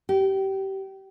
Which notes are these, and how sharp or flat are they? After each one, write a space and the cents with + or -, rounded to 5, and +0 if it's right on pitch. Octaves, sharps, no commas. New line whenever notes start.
G4 -25